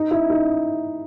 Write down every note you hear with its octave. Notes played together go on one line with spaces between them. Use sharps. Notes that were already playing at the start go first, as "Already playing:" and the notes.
Already playing: D#4
E4
D#4